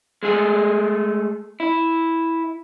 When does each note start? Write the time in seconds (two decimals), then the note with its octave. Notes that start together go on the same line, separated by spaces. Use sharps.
0.23 G#3 A3 G#4 A4
1.60 E4